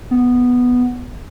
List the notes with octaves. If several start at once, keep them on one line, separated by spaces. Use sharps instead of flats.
B3